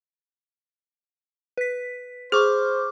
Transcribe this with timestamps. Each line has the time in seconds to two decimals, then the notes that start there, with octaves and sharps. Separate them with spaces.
1.57 B4 B6
2.32 G#4 C5 C#6 D6 F6